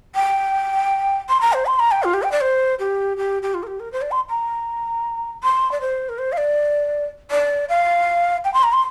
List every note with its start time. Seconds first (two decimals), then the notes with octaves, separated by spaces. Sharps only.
0.15 G5
1.29 C6
1.41 A#5
1.53 C5
1.66 C6
1.79 A#5
1.91 G5
2.04 F4
2.14 G4
2.23 G5
2.32 D5
2.41 C5
2.79 G4
3.17 G4
3.42 G4
3.54 F4
3.63 A#4
3.67 G4
3.80 A#4
3.92 C5
4.02 D5
4.11 C6
4.30 A#5
5.44 C6
5.71 D5
5.81 C5
6.09 A#4
6.18 C5
6.32 F5
6.37 D5
7.31 D5
7.69 F5
8.44 G5
8.54 C6
8.63 A#5
8.73 C6